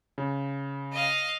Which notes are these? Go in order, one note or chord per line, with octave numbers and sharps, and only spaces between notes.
C#3
D#5 F5